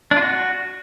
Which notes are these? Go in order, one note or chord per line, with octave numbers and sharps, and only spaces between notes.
D4
F4
F#4